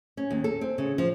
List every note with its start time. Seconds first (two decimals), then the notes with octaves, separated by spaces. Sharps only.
0.17 C#4
0.30 D#2
0.44 A4
0.61 C4
0.78 C#3
0.98 F3